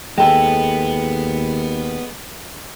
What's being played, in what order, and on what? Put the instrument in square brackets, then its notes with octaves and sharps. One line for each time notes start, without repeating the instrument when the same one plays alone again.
[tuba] D#2 [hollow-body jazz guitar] G#3 A4 [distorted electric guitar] B3 [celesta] G5